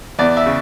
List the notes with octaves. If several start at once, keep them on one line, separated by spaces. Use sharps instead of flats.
E2 D5
E5
C#3